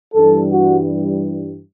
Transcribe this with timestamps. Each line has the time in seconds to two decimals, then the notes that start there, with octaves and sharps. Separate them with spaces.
0.15 G2 E3 G3 A4
0.52 F#4